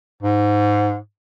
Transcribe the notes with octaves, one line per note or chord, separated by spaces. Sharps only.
G#2